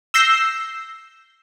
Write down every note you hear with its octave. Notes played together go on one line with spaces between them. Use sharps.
E6 G6 A#6 C7